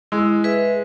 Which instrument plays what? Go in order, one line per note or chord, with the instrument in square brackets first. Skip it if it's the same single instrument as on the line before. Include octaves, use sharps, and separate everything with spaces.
[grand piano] G#3 [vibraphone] E4
[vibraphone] G#4 B4 E5